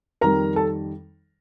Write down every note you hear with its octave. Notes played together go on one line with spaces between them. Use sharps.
F2 D#3 G3 A#4 A#5
A4 A5